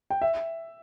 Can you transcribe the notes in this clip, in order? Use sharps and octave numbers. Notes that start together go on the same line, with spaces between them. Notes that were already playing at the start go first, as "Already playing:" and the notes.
G5
E5